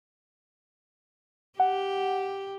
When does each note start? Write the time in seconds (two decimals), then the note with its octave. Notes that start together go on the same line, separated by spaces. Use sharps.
1.60 G4 F#5